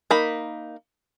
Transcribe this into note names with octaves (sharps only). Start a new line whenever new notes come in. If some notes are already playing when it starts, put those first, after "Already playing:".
A#3 D#4 B5